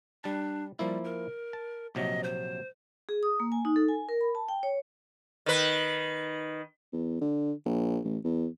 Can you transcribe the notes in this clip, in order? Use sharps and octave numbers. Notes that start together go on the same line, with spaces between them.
G3 D4 A5
F3 G3 A#3 E4
A#4
A5
A#1 C3 F#3 D#5
C5
G#4
D#6
A#3
G#5
D#4
A4
G#5
A#4
B5
A5
G5
C#5
D#3 B4
E2
D3
A#1
A1
E2